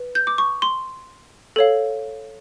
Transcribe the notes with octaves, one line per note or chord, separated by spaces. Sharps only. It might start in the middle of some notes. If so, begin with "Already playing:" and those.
Already playing: B4
G6
D6
C#6
C6
A4 C#5 F5